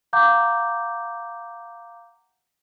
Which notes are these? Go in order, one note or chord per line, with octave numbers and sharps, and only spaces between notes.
F5 F#5 A#5 D6 G6